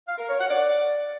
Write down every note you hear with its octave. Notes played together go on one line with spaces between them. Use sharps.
F5
A#4
C#5
F#5
D5